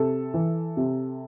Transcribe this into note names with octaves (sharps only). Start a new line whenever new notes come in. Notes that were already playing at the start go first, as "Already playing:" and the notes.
Already playing: C3 A4
E3
C3